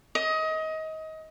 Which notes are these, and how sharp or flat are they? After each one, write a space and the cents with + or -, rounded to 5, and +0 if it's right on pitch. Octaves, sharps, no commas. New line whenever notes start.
D#5 +25